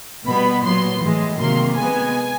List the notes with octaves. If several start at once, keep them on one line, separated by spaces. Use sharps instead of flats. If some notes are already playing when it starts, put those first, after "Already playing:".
B2 G3 B3 B5
A#2 F#3 B3 C6
A2 E3 G#3
C3 D#3 F#3 A#3 C6
D#3 G#3 B3 G#5